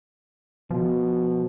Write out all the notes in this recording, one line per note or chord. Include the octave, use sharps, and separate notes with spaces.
B2 F3